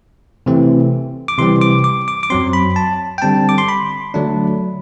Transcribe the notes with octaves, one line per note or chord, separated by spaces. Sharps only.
C3 E3 A3 C4
D6
C3 E3 G3 C4 C6
D6
D6
D6
D6
F#2 F#3 C4 C6
B5
A5
G5
D3 G3 C4 A5
D6
C6
B5
D3 F#3 A3 D4